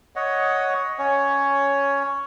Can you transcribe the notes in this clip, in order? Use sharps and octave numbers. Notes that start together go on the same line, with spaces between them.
C#5 D#5 F#5
C#4 C#5